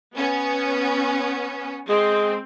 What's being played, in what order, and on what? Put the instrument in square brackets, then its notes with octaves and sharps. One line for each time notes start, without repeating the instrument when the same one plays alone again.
[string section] B3 C#4
[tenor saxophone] G#3 [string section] C4